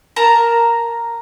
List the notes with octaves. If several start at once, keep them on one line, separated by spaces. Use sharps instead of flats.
A#4 A5 A#5